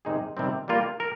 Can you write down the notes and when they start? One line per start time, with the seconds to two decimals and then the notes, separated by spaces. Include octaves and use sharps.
0.05 C3 D#3 G#3 D#4 G#4
0.37 C3 D#3 G3 C4
0.68 G3 A#3 F4 A#4
1.00 A#4